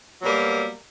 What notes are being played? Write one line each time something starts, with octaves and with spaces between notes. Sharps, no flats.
B2 F#3 G3 A#3